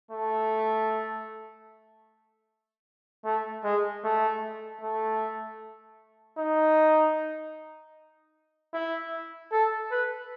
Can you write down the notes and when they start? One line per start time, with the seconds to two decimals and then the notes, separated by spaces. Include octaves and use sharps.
0.11 A3
3.25 A3
3.64 G#3
4.04 A3
4.81 A3
6.38 D#4
8.74 E4
9.52 A4
9.91 B4